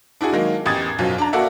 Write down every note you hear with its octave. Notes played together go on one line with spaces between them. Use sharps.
D4 E4 F#4 G#4
D#3 F#3 G#3 A#3
A1 E2 G4 D#6 G#6 A6
B1 F#2 F3 F#3
D4 A#5
A#3 F#4 A4 D5 E5 F#5